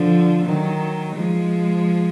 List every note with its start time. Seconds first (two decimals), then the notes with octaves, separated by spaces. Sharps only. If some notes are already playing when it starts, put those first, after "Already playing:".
Already playing: D3 F3
0.46 D#3 F#3
1.16 F3 G#3